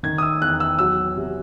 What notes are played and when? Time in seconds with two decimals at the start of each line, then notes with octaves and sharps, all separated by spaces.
0.03 D#3 G#6
0.18 D#6
0.22 E6
0.41 E2 F#6
0.60 E6
0.79 F#3 E6
1.17 C3